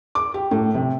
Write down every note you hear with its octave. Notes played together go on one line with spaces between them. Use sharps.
D6
G4
A2
C3